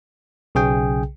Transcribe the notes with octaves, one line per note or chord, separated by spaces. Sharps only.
B1 C#3 G#4 G5